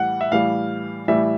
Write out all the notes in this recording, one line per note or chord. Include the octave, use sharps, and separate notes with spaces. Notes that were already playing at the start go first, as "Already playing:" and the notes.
Already playing: A2 E3 G3 F#5
E5
A2 E3 G3 F5
A2 E3 G3 E5